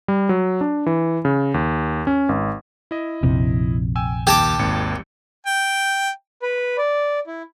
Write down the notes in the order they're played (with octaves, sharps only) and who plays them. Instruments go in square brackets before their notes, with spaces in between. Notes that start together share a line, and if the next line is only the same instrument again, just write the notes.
[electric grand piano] G3
F#3
D4
E3
C#3
D#2
C#4
G#1
E4 D#5
[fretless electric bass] A#1 F2 C3
[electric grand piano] G5 G#5 E6
[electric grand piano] D#2 G6 G#6 [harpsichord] G4 A5 D6
[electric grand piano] G#1 D#2 C#7
[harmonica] G5
[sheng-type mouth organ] B4
D5
E4